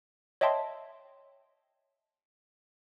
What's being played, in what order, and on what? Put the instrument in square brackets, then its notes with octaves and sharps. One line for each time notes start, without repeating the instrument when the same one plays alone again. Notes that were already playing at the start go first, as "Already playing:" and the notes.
[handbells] C#5 D#5 E5 G5 A5 C6